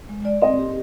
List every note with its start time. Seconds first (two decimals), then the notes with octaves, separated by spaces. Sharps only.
0.09 G#3
0.25 D5
0.42 C4 D#5
0.59 G4